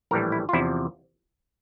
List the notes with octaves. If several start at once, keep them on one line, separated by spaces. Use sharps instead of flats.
A#1 A2 E3 G3 A#4
E4
F4
E2 C3 F3 E4